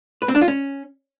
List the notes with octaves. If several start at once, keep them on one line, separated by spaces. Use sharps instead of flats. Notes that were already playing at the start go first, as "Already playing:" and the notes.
B4
C4
D4
F4
C#4